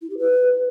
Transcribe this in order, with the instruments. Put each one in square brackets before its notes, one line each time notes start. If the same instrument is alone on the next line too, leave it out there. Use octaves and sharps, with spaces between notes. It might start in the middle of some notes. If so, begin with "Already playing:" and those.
[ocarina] E4
G4
B4